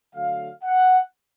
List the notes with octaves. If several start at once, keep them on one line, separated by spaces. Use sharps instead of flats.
D3 F#3 A3 F5
F#5